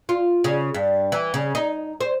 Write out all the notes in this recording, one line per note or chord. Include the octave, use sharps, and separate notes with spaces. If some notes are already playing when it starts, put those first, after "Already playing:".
F4
C#3
G2
E3
C#3
D#4
C5